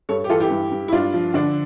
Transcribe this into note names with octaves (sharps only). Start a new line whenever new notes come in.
G2 A4 C#5
G4
E3 F4 A4
E4 G4
G2
G2
E4
G2 D4 F4
F3
D3 D4